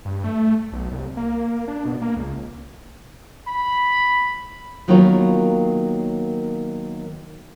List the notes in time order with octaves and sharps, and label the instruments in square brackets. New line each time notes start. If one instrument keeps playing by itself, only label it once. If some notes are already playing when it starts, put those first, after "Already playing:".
[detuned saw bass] G2
A3
B1
C2
A#3
D4
B2
A#3
C#2
[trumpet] B5
[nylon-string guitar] D#3 F#3 A#3 B3 F4 C#5